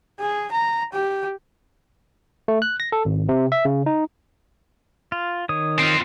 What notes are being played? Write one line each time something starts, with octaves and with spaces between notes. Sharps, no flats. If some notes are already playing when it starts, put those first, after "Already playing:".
G#4
A#5
G4
A3
F#6
A#6
A4
G#1
C3
E5
C#3
D#4
F4
D#3 C#5 D#6
C4 F4